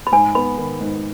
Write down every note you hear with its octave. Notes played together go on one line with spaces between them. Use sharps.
B5
G#2 G#5
B3 B5
D#3
G#2